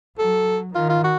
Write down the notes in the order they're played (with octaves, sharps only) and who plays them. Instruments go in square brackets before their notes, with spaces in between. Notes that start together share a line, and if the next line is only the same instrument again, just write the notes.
[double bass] F#3 [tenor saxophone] A4
[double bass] D#3 [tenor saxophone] F4
[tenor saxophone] F4
F#4